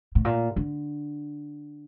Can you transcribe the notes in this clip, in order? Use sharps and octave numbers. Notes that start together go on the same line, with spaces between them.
A2
A#2
D3